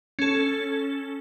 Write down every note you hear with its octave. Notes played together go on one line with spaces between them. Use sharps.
C#4 A4